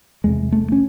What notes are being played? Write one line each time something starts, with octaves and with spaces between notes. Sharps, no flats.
E2 C3 G#3
A3
C#4